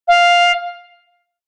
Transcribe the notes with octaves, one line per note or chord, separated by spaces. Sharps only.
F5